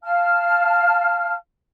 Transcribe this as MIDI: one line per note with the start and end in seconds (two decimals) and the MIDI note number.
0.03 1.33 77
0.03 1.33 81
0.03 1.33 89